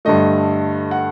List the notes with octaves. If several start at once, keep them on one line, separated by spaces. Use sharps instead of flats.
G2 D3 A3 D#5
F#5